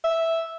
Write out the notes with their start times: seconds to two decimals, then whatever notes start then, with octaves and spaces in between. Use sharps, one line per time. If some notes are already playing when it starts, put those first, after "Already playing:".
0.04 E5